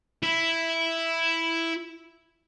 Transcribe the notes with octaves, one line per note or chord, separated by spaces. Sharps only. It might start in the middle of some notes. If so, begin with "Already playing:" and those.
E4